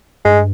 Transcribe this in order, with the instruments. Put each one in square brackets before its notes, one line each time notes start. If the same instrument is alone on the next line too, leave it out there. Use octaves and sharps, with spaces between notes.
[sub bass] G2 [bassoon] G#3